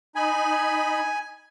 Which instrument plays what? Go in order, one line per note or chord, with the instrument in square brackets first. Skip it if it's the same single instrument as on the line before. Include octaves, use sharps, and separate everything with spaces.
[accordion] D#4 B5 [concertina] G#5